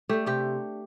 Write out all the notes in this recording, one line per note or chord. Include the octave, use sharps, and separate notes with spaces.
A3 D4 G4
C3 G4